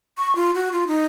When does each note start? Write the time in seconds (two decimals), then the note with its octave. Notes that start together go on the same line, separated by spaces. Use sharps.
0.18 C#6
0.36 F4
0.55 F#4
0.72 F4
0.87 D#4